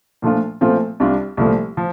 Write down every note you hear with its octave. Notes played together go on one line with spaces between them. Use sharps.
A#2 F3 A3 D4 F4
A#2 F3 A3 C4 F4
C2 C3 G3 D4 F4
C2 A#2 F3 A3
F3